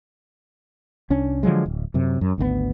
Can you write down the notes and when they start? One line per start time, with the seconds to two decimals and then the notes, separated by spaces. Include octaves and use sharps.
1.10 C2 C#4 D4
1.43 D3 F3 F#3 G#3
1.66 D1
1.94 F#2 C3
2.21 F#2
2.38 G#1 D2 C#3 B3